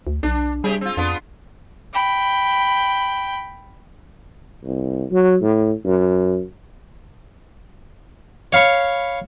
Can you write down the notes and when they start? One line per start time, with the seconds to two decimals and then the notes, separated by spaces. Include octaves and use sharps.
0.07 D2
0.23 B1 D4
0.64 C3 G3 G4 G#4
0.81 C4 F4
0.97 F2 B3 D4 F4
1.93 G5 B5
4.64 C2
5.11 F#3
5.42 A2
5.85 F#2
8.53 C#5 F5 B5 C#6